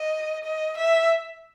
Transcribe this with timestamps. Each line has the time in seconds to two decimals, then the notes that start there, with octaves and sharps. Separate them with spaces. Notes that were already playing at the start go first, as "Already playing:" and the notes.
Already playing: D#5
0.44 D#5
0.77 E5